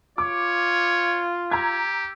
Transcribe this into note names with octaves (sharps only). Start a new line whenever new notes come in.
F4 C#5 D6
G4 A#5 E6 G#6